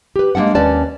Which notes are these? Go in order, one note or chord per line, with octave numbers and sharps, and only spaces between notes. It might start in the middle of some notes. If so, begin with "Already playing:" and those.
G4 B4
G#3 A#3 C#4 D4 F#5
D#2 C#4 B4 D5 A5